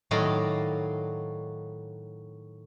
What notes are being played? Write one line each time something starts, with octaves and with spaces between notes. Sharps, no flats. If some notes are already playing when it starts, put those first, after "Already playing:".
A2 D#3 F#3 D5 D#5 F5